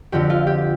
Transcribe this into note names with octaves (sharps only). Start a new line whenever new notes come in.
F2 D3 G4
F4
G4